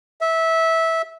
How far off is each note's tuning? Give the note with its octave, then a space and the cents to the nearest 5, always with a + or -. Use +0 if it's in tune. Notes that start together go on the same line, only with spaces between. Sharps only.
E5 -15